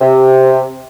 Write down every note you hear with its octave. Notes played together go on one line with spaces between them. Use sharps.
C3